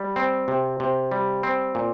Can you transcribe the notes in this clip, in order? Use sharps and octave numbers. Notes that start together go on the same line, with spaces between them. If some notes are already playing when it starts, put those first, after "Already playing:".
Already playing: G3
C4
C3
C3
G3
C4
A#2